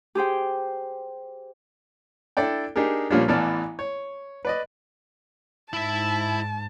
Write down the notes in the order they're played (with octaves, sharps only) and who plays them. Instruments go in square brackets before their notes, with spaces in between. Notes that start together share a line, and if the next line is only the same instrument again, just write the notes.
[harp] G4 G#4 C5 G5
[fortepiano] D4 E4 A4 D5 G5
D4 D#4 G4 G#4 A#4
A#2 F3 G3 A#3 C#4 D4
A1 E3 B3 D5 A5 F6
C#5
B4 D5 D#5
[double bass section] G#2 [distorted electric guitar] E4 E5 [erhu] A5